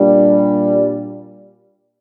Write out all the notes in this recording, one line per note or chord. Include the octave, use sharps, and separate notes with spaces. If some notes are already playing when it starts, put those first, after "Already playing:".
Already playing: A#2 G3 D4